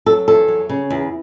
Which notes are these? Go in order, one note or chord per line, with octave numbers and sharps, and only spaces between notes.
F#3 A4
E2 A4
F#3
C#3
E2